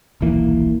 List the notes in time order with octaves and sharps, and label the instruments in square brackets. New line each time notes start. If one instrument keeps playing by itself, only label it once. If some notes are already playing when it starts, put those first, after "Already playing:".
[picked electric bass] D#1 B1 E3 A#3